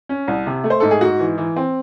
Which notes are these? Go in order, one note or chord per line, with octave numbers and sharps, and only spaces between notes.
C#4
C2
C3
A3
C5
G#2 A4
G#4
G#2 F#4
E3
E3
C4